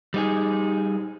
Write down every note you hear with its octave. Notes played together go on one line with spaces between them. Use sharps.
G3 D#4 G#4